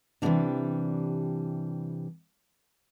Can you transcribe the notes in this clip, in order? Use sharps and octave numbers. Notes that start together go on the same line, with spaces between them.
C3 E3 G3 G#3 A#3 D4